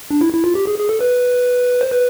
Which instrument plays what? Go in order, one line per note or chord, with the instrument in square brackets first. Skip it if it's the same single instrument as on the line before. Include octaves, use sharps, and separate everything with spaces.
[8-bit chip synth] D4
E4
E4
F4
G4
G#4
G#4
A4
B4
C5
B4